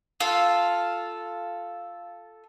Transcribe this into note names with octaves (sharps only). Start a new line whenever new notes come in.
F4 A4